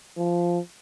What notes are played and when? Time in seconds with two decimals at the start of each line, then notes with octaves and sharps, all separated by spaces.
0.17 F3